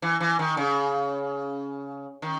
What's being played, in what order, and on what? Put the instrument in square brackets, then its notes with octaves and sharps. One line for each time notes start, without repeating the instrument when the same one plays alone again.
[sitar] E3
E3
D#3
C#3
D#3